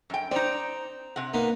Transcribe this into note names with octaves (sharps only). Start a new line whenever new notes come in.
F#2 G5
C4 D#4 D5 A#5
C3 F#5
A#3 B3 D#4